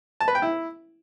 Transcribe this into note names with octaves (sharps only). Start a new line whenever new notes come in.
A5
B4
G5
E4